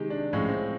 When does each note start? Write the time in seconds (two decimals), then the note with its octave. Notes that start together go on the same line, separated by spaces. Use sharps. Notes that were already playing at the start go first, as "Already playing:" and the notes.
Already playing: C3 D#3 G#3 G4
0.10 D4
0.33 A2 F3 G#3 C#4
0.49 C4